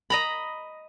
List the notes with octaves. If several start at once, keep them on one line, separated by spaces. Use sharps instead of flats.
D#5 A#5 B5